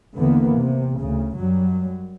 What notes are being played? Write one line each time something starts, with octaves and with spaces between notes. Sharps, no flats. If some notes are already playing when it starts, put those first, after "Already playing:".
D#2 D3 E3 A#3 B3
C3
D2 C#3
F#2 F#3 G3